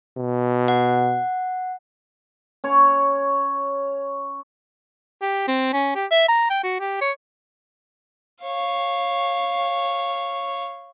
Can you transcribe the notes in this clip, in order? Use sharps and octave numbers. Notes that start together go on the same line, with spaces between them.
B2
F#5
C#4 C#5
G4
C4
C#4
G4
E5
A#5
G5
F#4
G4
C#5
C#5 F5